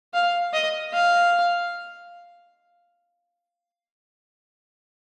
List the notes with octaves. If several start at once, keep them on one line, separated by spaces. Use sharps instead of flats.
F5
D#5
F5